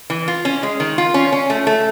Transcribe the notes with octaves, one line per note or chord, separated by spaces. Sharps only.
E3
F4
C#4
G#3
D#3
F4
C#4
C#4
A3
A3